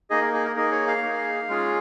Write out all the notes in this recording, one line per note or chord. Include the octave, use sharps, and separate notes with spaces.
A#3 D#4 G#4 D#5
A#4
G#4
A#4
A#3 D#4 G#4 A#4
C#5
F5
A#3 D#4 G#4
G#3 C#4 F4 G#4